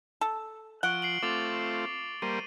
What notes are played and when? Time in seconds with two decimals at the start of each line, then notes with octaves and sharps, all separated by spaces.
0.21 A4
0.83 F3 F#5 C#6 D7 G7
1.02 C7 D7 F#7
1.23 A3 C4 F4 D6 A6 F7
2.22 G3 A#3 C5 D#7